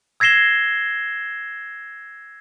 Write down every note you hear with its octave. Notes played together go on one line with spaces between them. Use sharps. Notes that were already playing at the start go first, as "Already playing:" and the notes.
E6 G#6 A#6 C7 E7 G7